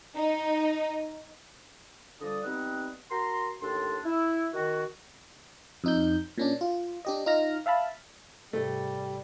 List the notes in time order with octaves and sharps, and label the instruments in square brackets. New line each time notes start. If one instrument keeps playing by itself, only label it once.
[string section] D#4
[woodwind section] D3 F3 G3 D5 D#6
G3 B3 C4 D#4 D#5 F#5
F#4 A#4 A#5 C6
D#2 A2 D4 A4 C6
E4
D#3 F#4
[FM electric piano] F2 D#4 G6
A#2 C#4 D4
F4
D4 G4 D#5
D#4 F4 F6 A#6
E5 F5 A5 B5
[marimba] G#2 C3 [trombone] G3 [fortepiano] A3